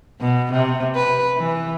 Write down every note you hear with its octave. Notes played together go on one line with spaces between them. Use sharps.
B2
C3
B4
E3